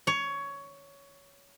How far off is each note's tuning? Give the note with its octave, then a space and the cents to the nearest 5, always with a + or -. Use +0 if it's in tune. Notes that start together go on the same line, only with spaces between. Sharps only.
C#5 +15